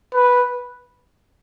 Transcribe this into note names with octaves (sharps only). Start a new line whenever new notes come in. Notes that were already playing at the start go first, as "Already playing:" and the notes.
B4